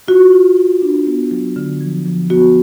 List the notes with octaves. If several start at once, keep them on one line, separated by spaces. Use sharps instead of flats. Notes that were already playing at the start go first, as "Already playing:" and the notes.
F4 F#4
F4
F4
D4
B3
F#3
D3
F3
F3
B3 F#4